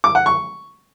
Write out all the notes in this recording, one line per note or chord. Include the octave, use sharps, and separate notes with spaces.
D6
F#5
C#6